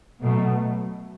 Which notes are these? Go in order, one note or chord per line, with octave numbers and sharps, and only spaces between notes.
B2 F#3 A3